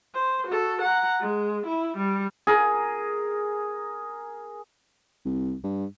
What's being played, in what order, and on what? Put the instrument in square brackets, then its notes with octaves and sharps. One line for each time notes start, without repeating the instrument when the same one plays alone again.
[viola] C5
F#4 A4
F#5 A#5
G#3
E4
G3
[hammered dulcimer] G#4 A#4
[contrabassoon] C2
G2